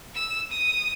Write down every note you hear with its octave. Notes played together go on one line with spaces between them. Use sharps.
E6
D#6